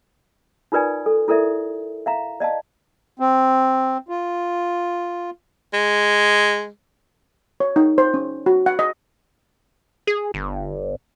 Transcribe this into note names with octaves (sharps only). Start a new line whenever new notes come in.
D#4 F4 A#4 B4 D5 G#5
A4
E4 A4 A#4 D5 E5
E5 F5 A#5
D5 D#5 F5 A5
C4
F4
G#3
C#5
D#4
C5
C#4
F#4
F#5
D#5
G#4
G1